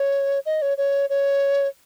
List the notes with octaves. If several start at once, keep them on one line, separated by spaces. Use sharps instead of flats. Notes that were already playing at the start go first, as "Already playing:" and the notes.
Already playing: C#5
D#5
C#5
C#5
C#5